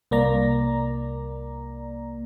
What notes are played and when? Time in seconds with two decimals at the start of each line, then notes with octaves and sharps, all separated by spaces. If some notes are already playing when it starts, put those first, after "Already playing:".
0.11 C2 A#3 D5 A#5